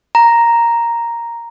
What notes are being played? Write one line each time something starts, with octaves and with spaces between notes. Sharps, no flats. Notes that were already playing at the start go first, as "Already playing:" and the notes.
A#5